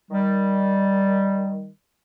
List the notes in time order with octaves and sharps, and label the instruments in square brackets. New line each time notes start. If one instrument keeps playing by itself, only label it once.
[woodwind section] D#3 G3